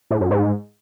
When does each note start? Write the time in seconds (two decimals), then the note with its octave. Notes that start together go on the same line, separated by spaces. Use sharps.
0.11 A2
0.21 F#2
0.31 G#2